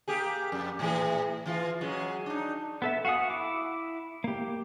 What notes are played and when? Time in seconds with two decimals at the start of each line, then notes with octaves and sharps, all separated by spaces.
0.08 A#3 G4 G#4
0.52 F2
0.79 A2 E3 G#4
1.46 E3 F4
1.81 F#3 G#3 C#4
2.26 D4 D#4
2.82 B3 A4 E5
3.05 F#4 F5 F#5 G#5 D#6
3.30 E4 D6
4.24 A#3 G4